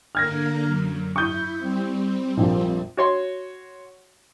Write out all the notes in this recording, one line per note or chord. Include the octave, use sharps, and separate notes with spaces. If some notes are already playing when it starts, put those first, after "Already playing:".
D3 A#3 A#4 F6 G#6 A#6
F#2
E4 C#6 D#6 G6
G3 C4
A#1 F2 A#2
F#4 C#5 C6